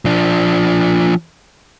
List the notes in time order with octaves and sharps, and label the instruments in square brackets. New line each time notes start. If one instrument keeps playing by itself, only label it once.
[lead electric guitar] F3 D4